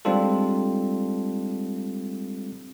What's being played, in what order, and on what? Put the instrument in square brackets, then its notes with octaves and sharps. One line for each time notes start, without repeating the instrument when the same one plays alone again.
[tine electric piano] G3 G#3 C4 D4 F4 A4